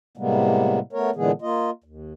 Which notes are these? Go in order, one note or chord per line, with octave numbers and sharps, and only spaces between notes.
A2 C3 G3 G#3 A#3 B3
A3 B3 A#4 C#5
A#2 D3 E3 G#3 B3 G#4
A#3 F4 D#5
D#2